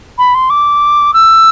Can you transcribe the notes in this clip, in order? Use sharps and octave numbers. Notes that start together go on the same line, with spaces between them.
B5
C6
D6
E6